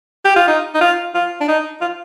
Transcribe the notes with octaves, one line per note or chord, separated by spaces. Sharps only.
G4
F4
D#4
D#4
F4
F4
D4
D#4
F4